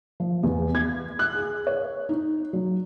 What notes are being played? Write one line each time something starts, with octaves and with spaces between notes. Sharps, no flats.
F3
E2
G#6
F#6
G#4
C#5
D#4
F#3